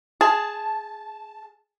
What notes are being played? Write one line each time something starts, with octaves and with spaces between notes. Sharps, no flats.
G#4 A5